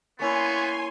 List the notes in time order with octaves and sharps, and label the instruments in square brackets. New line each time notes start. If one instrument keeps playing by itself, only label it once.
[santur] A#3 C#4 E4 [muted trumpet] B3 [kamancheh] C#5 [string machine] G#5 C6